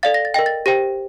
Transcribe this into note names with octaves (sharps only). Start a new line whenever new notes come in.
A4 D5 F5 A6
A#6
A6
A#4 D#5 G5 A#6
A6
G4 C5 G5 A#6